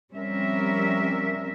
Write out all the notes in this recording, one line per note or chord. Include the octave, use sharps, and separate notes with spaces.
F3 G3 C4 C#4 A#4 E5